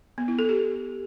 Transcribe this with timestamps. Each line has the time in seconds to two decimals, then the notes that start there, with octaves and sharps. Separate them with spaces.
0.18 B3
0.28 E4
0.39 A4
0.49 G4